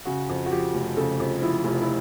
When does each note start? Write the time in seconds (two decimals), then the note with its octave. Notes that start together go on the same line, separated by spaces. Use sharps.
0.05 C#3 F#4
0.29 F2
0.46 F#4
0.51 F3 G4
0.74 F1
0.97 C#3 A4
1.20 F2
1.42 F3 E4
1.65 F1
1.82 E4